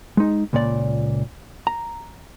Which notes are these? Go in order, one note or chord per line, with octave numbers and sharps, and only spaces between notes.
G#3 D#4
C#2 A#2 D5
A#5